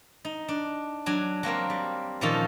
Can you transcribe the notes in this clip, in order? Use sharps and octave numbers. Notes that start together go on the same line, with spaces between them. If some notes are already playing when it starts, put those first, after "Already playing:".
D#4
D4
F#3 D4 G#5
F#3 A#3 C4 A#4
G3
A#2 D#3 F3 C#4 D#4 A4